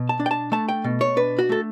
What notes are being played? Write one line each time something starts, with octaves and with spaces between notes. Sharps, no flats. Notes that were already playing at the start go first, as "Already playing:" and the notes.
Already playing: B2
A5
D4
G5
A5
A3 A5
G5
B2
C#5
D4 B4
F#4
A3 A4